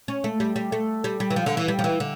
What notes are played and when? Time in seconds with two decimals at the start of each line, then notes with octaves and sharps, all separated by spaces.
0.08 C#4
0.24 A3
0.40 G3
0.56 G3
0.72 A3
1.04 G3
1.20 G3
1.30 E3
1.36 F3
1.46 D3
1.57 E3
1.68 G3
1.79 F3
1.84 E3
2.00 D3